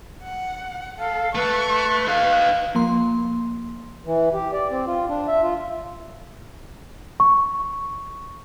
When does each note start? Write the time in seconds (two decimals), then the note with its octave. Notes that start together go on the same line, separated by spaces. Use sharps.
0.23 F#5
0.98 A4 F5
1.35 A3 A4 B4 C#6
2.07 D#4 F5
2.75 F3 A#3 C6
4.05 E3
4.33 G4
4.53 D5
4.71 C4
4.87 F4
5.09 D4
5.28 E5
5.43 F4
7.20 C#6